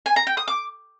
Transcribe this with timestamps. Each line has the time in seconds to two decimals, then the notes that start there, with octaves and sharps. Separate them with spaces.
0.06 G#5
0.16 A#5
0.27 G5
0.37 D#6
0.48 D6